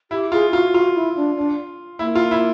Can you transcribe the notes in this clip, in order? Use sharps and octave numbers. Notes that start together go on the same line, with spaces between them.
E4 G4
F4 G#4
F4 F#4
F4 F#4
E4
D4
D4
A#3 E4
F4
E4